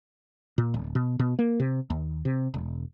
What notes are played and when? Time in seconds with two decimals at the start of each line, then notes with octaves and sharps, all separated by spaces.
0.58 A#2
0.74 D1
0.95 B2
1.19 B2
1.39 A#3
1.60 C3
1.90 D#2
2.25 C3
2.54 E1